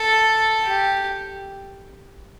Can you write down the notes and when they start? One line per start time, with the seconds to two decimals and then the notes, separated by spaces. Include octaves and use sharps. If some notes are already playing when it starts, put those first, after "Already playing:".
Already playing: A4
0.64 G4